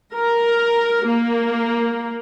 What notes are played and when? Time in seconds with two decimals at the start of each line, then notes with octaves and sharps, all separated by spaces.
0.13 A#4
1.06 A#3